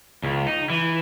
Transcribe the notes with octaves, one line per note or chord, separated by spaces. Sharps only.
C#2
D#4
E3